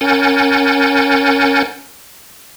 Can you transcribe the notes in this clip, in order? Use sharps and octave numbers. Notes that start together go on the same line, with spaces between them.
C#4 A#4 F#5 G#5 G6 A6